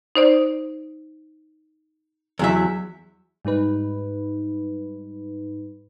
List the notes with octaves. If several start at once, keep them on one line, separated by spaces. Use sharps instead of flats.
D#4 C5 D5
E2 F#3 E5
G#2 G3 D#4 B4